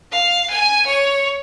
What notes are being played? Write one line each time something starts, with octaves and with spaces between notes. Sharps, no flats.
F5
G#5
C#5